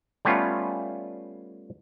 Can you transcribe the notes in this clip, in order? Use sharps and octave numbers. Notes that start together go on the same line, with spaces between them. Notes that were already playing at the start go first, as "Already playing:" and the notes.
G3 A3 B3 C#4 F4